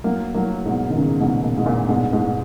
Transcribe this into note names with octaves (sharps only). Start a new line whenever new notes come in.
F#3 A#3
F#3 A#3
G#2 B2
D#3
A#2 C#3
G#2 B2
A#2
G#2
A#2
G#2 B2
G#2 B2